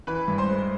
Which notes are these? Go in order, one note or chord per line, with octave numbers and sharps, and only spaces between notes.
E3 B4 B5
G2
C5 C6
G#3